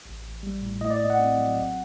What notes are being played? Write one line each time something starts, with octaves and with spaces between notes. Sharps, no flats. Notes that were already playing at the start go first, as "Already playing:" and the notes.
A1
A1
G3
A2
A2 D#5
D5
A2 D#5
F#5
C4
F#3
A#1